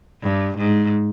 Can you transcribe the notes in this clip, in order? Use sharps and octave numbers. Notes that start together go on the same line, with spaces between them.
G2
G#2